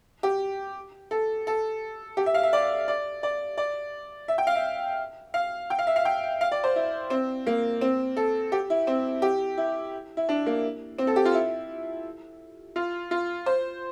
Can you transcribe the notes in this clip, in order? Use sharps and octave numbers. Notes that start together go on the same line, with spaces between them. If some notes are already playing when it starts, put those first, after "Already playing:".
G4
A4
A4
G4
E5
F5
E5
D5
D5
D5
D5
E5
G5
F5
E5
F5
G5
F5
E5
F5
G5
F5
D5
C5
E4
C4
A#3
C4
A4
G4
E4
C4
G4
E4
E4
D4
A#3
C4
A4
G4
F4
E4
F4
F4
C5